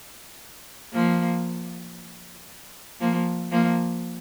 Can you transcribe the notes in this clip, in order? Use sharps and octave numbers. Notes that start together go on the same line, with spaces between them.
F3 A#3
F3 A#3
F3 A#3